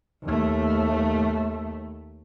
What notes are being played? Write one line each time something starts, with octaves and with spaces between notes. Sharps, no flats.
D#2 A3